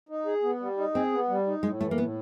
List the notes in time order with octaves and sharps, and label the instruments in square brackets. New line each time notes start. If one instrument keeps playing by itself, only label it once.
[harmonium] D#4
G#4
B3
G3
D#4
[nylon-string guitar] C4 [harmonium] G#4
[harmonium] B3
G3
D#4
[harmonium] A2 [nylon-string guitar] G#3
[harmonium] E3 [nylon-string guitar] A3
[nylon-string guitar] A#3
[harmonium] A2 [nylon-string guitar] B3